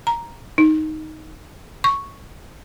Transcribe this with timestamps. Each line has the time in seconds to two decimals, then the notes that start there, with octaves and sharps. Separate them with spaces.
0.07 A#5
0.58 D#4
1.84 C#6